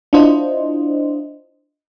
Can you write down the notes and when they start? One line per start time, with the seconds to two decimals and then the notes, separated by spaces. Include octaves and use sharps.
0.13 D4 E4 F4 C5 D#5